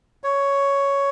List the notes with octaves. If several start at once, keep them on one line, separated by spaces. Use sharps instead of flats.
C#5